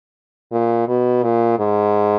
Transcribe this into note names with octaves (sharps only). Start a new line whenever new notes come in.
A#2
B2
A#2
G#2